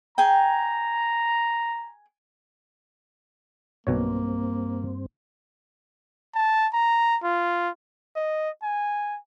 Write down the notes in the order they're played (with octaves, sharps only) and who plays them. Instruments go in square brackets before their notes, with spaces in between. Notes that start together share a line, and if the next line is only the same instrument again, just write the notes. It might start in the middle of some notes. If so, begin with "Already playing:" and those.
[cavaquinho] G#4 G5 [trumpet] A#5
[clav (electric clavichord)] B1 B2 C#5 [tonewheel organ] G2 C4 [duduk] A#3
[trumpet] A5
A#5
F4
[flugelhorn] D#5
G#5